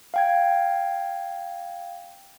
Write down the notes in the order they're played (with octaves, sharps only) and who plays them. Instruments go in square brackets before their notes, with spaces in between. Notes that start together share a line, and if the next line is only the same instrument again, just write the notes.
[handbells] F5 G5 G#6